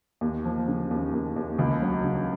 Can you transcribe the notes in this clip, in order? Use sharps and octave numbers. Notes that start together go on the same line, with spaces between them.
D#2
F3
C#3
D#2
D#2
D#2
C#2
F#3
C#3